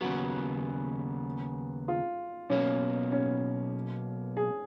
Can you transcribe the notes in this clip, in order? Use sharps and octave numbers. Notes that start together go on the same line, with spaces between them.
D#2 C#3 F#3 B3 F#4
F4
B1 B2 A#3 C#4
C#4
G#4